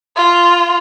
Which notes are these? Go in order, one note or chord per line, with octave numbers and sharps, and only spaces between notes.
F4